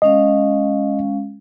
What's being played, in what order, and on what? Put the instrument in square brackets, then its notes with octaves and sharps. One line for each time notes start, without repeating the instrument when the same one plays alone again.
[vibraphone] G#3 C#4 F5 [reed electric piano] D#5